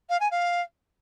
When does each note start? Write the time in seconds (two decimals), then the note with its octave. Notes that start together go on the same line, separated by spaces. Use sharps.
0.09 F5
0.20 G#5
0.31 F5